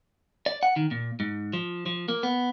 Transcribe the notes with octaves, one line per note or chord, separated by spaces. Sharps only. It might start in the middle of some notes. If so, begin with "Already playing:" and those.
D5
F#5
D#3
A#2
G#2
F3
F3
A#3
B3